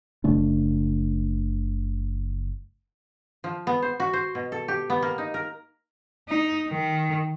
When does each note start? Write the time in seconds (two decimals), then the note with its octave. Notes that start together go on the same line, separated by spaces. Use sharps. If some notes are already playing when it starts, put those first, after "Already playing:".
0.24 F#1 C#3 A3 D4
3.44 F3
3.67 B3
3.82 C5
4.00 F#4
4.13 C5
4.35 B2
4.52 A4
4.68 G4
4.90 B3
5.02 A#3
5.18 D#4
5.34 A#4
6.29 D#4
6.68 D#3